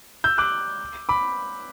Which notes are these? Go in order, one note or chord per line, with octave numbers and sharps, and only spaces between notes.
E6 G6
D6 F#6
B5 D6